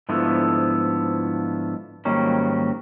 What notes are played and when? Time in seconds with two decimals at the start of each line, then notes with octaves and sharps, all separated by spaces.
0.09 G#2 D3 F3 A3 B3 E4
2.05 G#2 D#3 F#3 G3 A#3 C#4